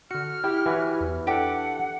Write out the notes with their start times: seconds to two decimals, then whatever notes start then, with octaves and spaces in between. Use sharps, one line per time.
0.11 D3 F#4 F6 C#7
0.44 E4 G4 G5
0.66 E3 F#4 B4 C#5
1.01 E2
1.27 D4 G4 A4 F#5 G5 D6